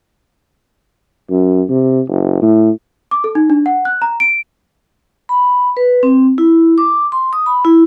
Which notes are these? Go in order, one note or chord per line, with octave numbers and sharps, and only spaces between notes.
F#2
C3
F#1
A2
D6
A4
D#4
D4
F#5
F#6
A#5
D7
B5
B4
C4
E4
D6
C6
D#6
B5
E4